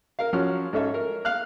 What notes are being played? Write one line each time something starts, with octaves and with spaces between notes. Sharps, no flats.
A#4 F5
F3 F#3 C#4 F#4 F6
G#2 C#4 A4 E5
A#4
F5 F6 F#6